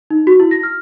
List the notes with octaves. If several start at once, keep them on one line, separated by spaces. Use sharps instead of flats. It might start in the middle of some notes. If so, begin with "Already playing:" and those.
D#4
F#4
E4
A#6
F6